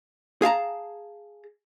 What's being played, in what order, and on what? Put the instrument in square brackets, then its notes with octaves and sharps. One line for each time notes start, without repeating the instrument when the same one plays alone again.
[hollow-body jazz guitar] G#4 F5 A5 A#5